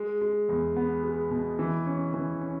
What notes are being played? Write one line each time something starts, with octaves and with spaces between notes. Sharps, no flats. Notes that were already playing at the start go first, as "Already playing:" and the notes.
Already playing: G#3
G#3
E2
B3
G#3
B2
E3
C#4
E3
C#4